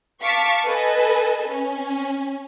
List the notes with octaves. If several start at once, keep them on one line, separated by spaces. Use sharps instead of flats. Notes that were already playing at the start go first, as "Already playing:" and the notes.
F5 A5 C#6 D6 B6
A4 B4 D#5 G#5
C#4